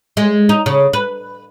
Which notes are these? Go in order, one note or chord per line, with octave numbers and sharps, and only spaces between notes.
G#3
D#4
C#3
B4